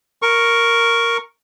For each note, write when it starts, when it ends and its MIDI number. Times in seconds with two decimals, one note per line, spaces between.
0.22 1.17 70
0.22 1.17 85